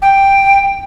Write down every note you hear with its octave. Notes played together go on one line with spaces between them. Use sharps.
G5